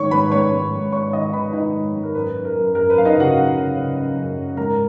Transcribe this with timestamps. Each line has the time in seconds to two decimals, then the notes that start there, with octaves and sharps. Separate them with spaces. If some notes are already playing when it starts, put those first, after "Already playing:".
Already playing: G#2 D#3 C#5 C#6
0.11 G#2 B4 B5
0.31 G#2 C#5 C#6
0.52 G#2
0.72 G#2
0.92 G#2 C#5 C#6
1.13 D#3 D#5 D#6
1.33 D#3 B4 B5
1.53 D#3 D#4 D#5
1.73 G#2
1.94 G#2
2.03 A#4
2.14 F#2 B4
2.35 F#2
2.45 A#4
2.55 F#2
2.75 F#2 A#4
2.90 B4
2.95 F#2 F5
3.05 D#4 D#5
3.15 C#3
3.20 F#4 F#5
3.35 F#2
3.56 C#3
3.76 C#3
3.96 C#3
4.16 F#2
4.37 C#3
4.57 G#2 A#4 A#5